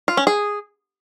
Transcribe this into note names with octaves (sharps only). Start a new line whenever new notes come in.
F4
C#4
G#4